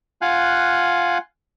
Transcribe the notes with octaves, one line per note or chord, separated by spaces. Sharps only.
F4 F5 F#5 G#5 F#6